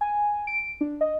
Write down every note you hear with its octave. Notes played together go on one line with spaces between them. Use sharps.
G#5
D7
D4
D#5